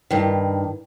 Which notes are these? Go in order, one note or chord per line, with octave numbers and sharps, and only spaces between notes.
G2 D#3